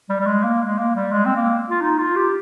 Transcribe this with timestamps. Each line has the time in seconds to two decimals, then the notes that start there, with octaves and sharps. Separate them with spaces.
0.10 G3
0.20 G3
0.26 G#3
0.44 A#3
0.67 G#3
0.78 A#3
0.95 G3
1.12 G#3
1.25 C4
1.35 A#3
1.70 F4
1.81 D#4
1.99 F4
2.16 G4